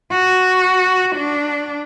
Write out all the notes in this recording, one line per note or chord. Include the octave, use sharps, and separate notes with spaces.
F#4
D4